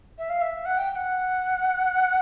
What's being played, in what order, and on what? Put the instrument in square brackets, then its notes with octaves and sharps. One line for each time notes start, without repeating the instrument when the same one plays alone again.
[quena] E5
F5
E5
F#5
G5
G5
F#5